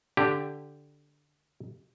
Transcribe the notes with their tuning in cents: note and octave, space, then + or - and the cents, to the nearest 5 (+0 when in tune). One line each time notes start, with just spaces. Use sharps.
D3 +0 G4 +0